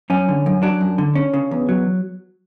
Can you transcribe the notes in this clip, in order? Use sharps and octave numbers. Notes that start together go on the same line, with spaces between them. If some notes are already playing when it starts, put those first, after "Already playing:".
F#2 C#4
D3
F#2
F#3 D4
F#2
D3
C#4
C#3
E2
F#3